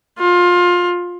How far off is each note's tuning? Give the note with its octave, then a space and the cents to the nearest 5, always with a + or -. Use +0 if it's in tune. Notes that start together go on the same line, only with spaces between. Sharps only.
F4 +20